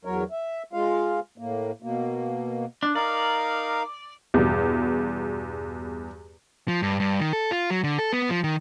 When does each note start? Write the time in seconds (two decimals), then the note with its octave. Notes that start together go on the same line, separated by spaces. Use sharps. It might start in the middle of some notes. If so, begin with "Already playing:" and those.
0.05 E2 F#3 A#4 C#5
0.31 E5
0.73 G#3 F4 F5
1.38 A2 A#3
1.82 B2 A#3
2.83 D4
2.95 D#4 A#4 D5 F5
4.34 E2 G2 B2
6.68 F3
6.82 G2
7.00 G2
7.20 D#3
7.33 A4
7.51 F4
7.70 F#3
7.84 D3
7.99 A4
8.13 B3
8.30 F3
8.44 D#3